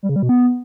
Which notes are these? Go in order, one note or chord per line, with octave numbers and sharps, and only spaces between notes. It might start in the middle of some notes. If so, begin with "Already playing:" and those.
G3
C#3
G3
B2
B3